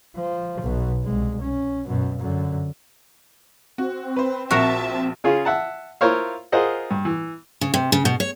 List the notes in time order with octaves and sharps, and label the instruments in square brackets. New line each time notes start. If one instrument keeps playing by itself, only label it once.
[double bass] F3
B1 B2
C2 G#3
C#4
F#2 B2
F#2 D3
[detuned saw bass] C4 [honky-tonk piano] F#4
[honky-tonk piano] B4 C5
[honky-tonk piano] A#1 E7 [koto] F#4 A#4 [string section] E5 A5
[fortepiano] C#3 C#4 F4 G#4
E5 F#5 A5
E4 F4 A#4 C5 C#5 F5
F4 G#4 A#4 C5 D#5 F#5
G2
E3
[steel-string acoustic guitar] C#3
C3
C#3
B2
C#5